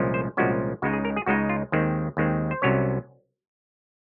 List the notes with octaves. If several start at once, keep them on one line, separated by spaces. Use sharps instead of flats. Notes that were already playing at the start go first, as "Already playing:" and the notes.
Already playing: C2 A#2 F3 G#3 C#4
C5
C2 A#2 F3 G#3 C#4 F#4
C#2 C#3 G#3 D#4 F#4
G#4
A#4
G#4
C#2 C#3 G#3 D#4 F#4
F4
D#2 D#3 G#3 C4
D#2 D#3 G#3 C4
C5
C2 C3 F#3 C#4 C#5